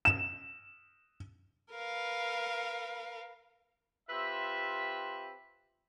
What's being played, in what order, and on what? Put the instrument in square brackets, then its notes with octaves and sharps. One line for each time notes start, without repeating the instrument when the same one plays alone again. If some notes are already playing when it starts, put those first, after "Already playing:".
[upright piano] E7
[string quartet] A#4 B4 F5
[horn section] C4 F4 G4 B4 E5